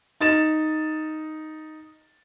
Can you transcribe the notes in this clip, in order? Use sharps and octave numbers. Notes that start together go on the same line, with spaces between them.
D#4 A6 E7